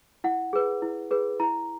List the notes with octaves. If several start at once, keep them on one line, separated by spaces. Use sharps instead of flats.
E4 F#5
G#4 B4
E4
G#4 B4
E4 A#5